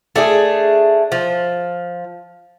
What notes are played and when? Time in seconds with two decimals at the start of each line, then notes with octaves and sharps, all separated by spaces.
0.16 A3 D4 G#4
1.12 F3